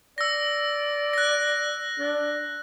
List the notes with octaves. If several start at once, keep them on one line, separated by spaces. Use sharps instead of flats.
D5 E6 A#6
F#6 A#6
D4